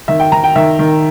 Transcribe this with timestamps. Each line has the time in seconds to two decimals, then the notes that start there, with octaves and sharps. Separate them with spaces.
0.08 D#3 E5
0.20 G5
0.32 D#3 A#5
0.44 G5
0.56 D#3 E5
0.79 D#3